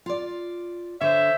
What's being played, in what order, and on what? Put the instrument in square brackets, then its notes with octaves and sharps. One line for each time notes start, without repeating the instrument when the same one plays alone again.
[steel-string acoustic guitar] F4 D5
[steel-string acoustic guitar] D3 [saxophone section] C5 C#5 E5